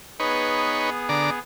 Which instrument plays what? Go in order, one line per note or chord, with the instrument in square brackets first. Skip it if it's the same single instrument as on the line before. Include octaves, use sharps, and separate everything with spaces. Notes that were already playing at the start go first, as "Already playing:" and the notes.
[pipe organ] B3 G#4 [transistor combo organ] D#4 B4 C#5
[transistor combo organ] D3 D5 A#5